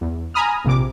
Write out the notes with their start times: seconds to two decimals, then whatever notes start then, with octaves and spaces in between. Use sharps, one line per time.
0.01 E2
0.34 G#5 A#5 B5 D#6 F6
0.65 A#1 C3 D6